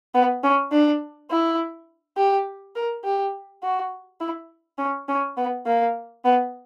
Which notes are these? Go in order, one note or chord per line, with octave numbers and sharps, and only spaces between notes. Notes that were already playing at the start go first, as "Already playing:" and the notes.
B3
C#4
D4
E4
G4
A#4
G4
F#4
E4
C#4
C#4
B3
A#3
B3